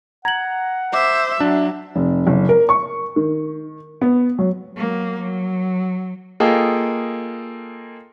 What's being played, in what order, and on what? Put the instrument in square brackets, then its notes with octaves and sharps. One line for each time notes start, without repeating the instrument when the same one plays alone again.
[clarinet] F#5 [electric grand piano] A#5 [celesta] G#6 F#7
[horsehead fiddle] C5 E5 [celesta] D6
[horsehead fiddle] F#3 [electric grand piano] D4 [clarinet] E5
[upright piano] F1
F#1
A#4
C#6
D#3
B3
F#3
[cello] F#3 A#3
F#3
[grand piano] A#3 F4 G#4 A4 D#5 G5